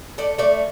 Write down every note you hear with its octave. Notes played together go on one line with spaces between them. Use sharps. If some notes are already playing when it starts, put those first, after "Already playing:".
A3 D5
A3 D5